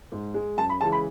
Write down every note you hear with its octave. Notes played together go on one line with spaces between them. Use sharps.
G#2
G#3
F#2 A5
B5
C#3 E3 G#3 A5
B5